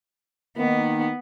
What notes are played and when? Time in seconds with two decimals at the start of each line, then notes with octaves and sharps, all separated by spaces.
0.58 D#3 A#3 B3 D#4